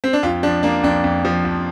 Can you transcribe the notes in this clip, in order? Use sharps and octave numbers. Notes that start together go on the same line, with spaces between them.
C4
D4
F2 F4
F3 D4
A#3 D4
F2 D4
F2
F3
F2